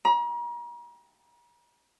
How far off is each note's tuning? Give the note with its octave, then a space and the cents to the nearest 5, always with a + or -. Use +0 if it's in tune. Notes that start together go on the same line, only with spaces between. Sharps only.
A#5 +40